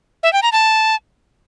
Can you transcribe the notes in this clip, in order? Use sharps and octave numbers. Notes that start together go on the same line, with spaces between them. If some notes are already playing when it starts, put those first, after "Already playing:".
E5
G5
A#5
A5